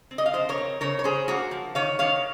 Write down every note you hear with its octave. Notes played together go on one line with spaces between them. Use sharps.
C4
D#5
F5
F3 C5 D#5
A#4 C#5
C4
C#3 A#4 C#5
C#5
C#4 G#4 C5
A#3 F#4 A#4
F3
D#3 C#5 F5
D#3 C#5 F5